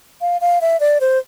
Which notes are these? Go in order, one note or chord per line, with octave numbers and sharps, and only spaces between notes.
F5
F5
E5
D5
C5